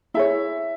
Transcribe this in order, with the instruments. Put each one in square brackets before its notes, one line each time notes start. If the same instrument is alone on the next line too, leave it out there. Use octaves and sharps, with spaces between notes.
[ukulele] E4 G#4 C#5 [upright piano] E5